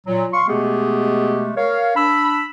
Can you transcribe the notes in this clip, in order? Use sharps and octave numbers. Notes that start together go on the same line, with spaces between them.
A#2 F#3
F5 C6 C#6
B2 G#3 A3 B3 G4 G#4
A#4 C#5 F5
D4 B5 E6